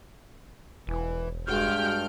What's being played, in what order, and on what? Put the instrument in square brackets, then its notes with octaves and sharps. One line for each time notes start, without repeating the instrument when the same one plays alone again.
[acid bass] E1 [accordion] E3
[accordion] G2 F6 G6 [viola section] G#3 F#4 G5